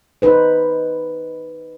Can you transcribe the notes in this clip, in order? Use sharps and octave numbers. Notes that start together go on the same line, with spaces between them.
D#4 B4 C5